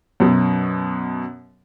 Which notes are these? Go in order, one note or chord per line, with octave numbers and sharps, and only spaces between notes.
F#2 B2